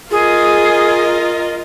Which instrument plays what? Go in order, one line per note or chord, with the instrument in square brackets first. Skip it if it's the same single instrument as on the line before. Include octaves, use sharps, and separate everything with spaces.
[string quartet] F4 A#4 D#5 [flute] G#4